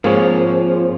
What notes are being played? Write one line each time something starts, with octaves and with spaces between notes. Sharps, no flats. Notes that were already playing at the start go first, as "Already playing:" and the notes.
G#2 F3 A#3 C4 G#4 C#5